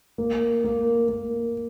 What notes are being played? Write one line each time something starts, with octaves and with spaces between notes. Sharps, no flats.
A#3
A#3
A#3